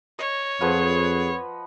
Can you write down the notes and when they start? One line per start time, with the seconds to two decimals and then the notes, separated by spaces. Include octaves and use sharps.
0.19 C#5 D#5
0.61 F2 F3 G#4 B4 F#5